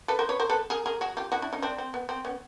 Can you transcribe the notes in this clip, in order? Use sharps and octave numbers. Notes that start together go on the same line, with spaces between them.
A4 B4
A#4 C5
B4 C#5
A#4 C5
A4 B4
G#4 A#4
G#4 A#4
F#4 G#4
F4 G4
E4 F#4
D4 E4
C#4 D#4
C4 D4
C4
B3
C4
B3 C#4